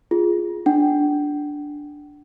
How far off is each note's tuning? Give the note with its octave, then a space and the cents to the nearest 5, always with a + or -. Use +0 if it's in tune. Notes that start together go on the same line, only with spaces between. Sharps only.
F4 +0 G#4 +0
D4 +0 F#5 +45